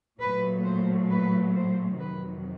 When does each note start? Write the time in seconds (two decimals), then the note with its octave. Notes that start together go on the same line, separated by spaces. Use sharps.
0.20 A#2 F#3 A3 B4
0.65 C5
1.10 B4
1.55 C5
1.99 F2 C3 D#3 F#3 B4